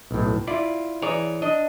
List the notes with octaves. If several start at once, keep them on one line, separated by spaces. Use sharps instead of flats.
B1 A2
E4 F4 D5
E3 G#4 C#5 D5 A#5
D4 D#5